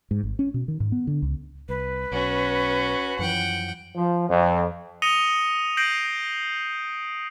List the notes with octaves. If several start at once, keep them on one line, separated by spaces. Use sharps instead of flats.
G#2
G#1
C#4
B2
D#3
G#2
B3
D3
C#2
C2 B4
B1 C#4 F#4
F#2 E3 F3 F#5 G5
F3
F2
D#6 A#6 C#7 D#7 F7 G7
G6 A#6 C7 D7 F7 F#7